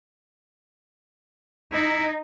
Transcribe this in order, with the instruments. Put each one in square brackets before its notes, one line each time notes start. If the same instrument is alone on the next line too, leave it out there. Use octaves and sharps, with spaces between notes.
[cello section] D#4 [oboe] E4